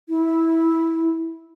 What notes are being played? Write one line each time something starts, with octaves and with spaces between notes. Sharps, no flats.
E4